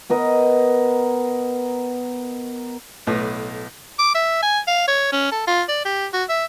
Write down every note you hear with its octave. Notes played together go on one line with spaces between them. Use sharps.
B3 A#4 D#5
B1 A2 B4
D6
E5
G#5
F5
C#5
C#4
A4
F4
D5
G4
F#4
E5